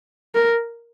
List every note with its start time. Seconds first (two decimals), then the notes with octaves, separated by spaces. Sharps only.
0.35 A#4